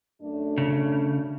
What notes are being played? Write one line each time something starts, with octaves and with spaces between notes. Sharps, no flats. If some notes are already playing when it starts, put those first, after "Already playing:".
F#2 A3 D4
C#3